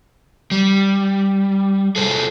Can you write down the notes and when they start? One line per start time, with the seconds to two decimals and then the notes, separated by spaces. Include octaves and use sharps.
0.51 G3
1.96 G#4 A4 C5